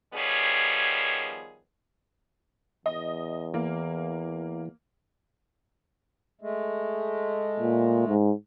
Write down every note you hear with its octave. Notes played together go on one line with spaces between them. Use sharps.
D#3 F3 G3 B3 G#4 C#5
E2 D#5
E3 A#3
G#3 A3
A#2
G#2